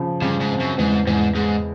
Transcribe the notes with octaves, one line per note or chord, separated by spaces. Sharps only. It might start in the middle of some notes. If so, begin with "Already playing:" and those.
Already playing: C#3 F3
G2 C#3
G#2
C4
F#2
E2 G#2
E2 G#2
G#2 G#3